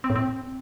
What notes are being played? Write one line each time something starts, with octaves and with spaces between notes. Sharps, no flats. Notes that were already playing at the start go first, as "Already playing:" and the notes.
C4
A2
C4